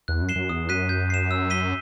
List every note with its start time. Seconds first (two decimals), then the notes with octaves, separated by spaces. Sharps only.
0.08 E2 F#6
0.22 F#2
0.29 C7 E7 G7
0.36 F#2
0.49 E2 D#6
0.69 F#2 F#6 B6 D#7
0.89 G6
1.10 C7 E7
1.31 E6
1.50 B6 D#7 G7